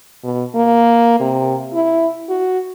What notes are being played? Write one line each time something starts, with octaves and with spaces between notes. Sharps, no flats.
B2
A#3
C3
E4
F#4